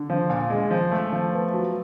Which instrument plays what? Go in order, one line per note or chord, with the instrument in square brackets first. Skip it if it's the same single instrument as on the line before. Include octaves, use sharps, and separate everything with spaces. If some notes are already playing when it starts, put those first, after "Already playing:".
Already playing: [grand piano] D3
F3
A#2
G#3
F3
A3
F3
B3
F#3